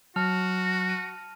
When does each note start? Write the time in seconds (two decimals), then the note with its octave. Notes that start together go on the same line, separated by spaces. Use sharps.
0.16 F#3 F#4 A5 F6 F7
0.89 D#7